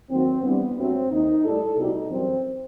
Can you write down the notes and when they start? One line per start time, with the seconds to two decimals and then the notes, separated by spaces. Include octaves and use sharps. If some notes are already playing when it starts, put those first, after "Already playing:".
0.09 D#2 D#3 F#3 A3 C4
0.43 G2 E3 G3 B3
0.76 G2 F#3 A3 C4
1.10 D#2 D#3 A3 D#4
1.43 A2 G3 A4
1.76 C2 B2 G3 D#4
2.10 F#2 E3 G3 C4